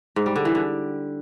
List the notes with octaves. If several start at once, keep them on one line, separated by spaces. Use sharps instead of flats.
G#2
G3
D3
E3
D3